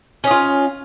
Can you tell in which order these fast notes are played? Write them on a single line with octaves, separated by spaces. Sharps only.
C#4 D#5 F4